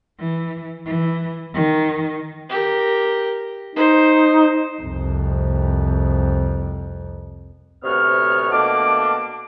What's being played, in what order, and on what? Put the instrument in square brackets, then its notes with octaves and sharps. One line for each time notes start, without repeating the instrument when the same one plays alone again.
[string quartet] E3
E3
D#3
[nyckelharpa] G4 A#4
[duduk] D#4 [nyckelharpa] C5
[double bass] C2 F2
[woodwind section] D2 C3 B3 C#5 F6
B2 A3 A#3 D4 D6